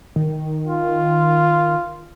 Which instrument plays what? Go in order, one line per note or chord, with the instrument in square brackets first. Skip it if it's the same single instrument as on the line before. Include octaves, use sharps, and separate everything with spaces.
[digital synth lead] D#3
[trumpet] F4